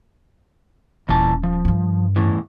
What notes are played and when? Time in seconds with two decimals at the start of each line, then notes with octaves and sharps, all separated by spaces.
1.09 D#1 A#2 E3 C#4 A5
1.43 F3
1.65 G2 D#3
2.16 E2 A2 E3